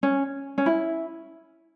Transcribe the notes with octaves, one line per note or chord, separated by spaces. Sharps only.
C#4
C#4
E4